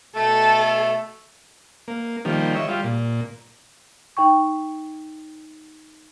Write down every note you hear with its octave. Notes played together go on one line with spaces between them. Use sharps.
B2 A3 A4
A#3
D#3 F3 G3 A#3
C#5 D#5 E5
G3 F4
A#2
D#4 G5 C#6